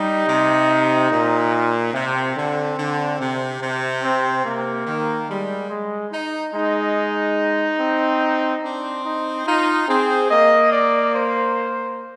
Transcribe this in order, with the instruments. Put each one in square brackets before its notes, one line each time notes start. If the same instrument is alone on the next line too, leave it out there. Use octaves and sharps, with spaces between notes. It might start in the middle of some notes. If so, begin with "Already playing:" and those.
Already playing: [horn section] G3 [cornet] D#4
[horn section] C3
A#2
[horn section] C3 [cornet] C4
[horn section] D3
D3
C3
C3
[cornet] C4
[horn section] C3 [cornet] A#3
[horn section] D#3
[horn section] G3 [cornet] G#3
[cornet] G#3
[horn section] D#4
[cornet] G#3 [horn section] D#4
[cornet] C4
[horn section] C4 [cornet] D4
[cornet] D#4
[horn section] D#4 [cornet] F4
[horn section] C4 [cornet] G#4
[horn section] A#3 [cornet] D#5
[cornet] D5
C5